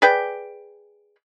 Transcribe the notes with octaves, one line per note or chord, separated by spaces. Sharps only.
G#4 B4 D5 G5